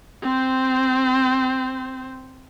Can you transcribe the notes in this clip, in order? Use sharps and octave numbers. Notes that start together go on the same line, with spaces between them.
C4 C5